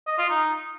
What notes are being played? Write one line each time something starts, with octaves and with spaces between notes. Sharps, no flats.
D#5
F4
D#4